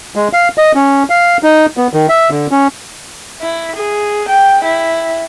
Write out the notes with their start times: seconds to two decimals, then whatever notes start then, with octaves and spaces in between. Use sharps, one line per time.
0.16 G#3
0.33 F5
0.58 D#5
0.75 C#4
1.10 F5
1.43 D#4
1.77 B3
1.94 D#3
2.09 E5
2.31 D3
2.51 C#4
3.41 E4
3.76 G#4
4.28 G5
4.64 E4